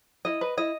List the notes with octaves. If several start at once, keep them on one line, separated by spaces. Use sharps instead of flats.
E4 D#5
B4
E4 D#5